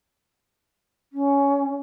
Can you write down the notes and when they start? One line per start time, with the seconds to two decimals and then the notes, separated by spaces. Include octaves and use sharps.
1.12 C#4